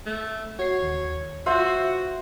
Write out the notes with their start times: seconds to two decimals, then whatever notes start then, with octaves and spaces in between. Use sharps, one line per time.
0.06 A3
0.59 F#4 C#5 C7
0.83 D#2
1.46 F4 F#4 C5 E5